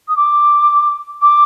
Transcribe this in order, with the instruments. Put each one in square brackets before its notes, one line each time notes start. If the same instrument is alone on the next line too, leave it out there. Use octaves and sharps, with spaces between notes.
[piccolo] D#6
D6
D6